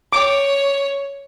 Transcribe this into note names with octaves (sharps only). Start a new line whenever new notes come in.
C#5 D6